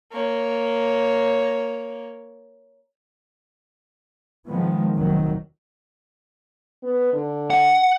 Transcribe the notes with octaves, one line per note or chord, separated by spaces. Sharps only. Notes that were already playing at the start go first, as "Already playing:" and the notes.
A#3 C#5
D#3 F3 G#3 B3
F1 D#2 D#3 F#3
B3
D3
F#5